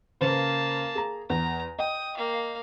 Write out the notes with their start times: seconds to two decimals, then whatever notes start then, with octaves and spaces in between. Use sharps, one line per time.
0.21 C#3 A#3 B4 C5 A5
0.95 G#4 A#5
1.30 E2 A#5
1.79 D#5 G5 D#6
2.17 A#3 F5